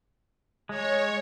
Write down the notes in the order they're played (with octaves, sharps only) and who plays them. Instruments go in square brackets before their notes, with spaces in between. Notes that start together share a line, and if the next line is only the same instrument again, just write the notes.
[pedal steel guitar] G#3 [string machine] C#5